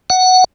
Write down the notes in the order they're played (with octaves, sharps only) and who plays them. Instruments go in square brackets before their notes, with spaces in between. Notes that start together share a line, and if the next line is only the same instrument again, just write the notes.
[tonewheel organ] F#5